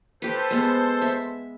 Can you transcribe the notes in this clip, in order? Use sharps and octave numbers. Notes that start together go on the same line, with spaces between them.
G4 A4 B4 C5
G#3 B3
E5